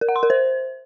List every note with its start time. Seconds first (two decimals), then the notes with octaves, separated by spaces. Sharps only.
0.01 A#4
0.09 F#5
0.16 C6
0.23 A#4
0.30 C5